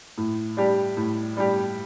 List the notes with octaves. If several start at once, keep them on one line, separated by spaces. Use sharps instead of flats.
A2
G3 D4 G4
A2
G3 D4 G4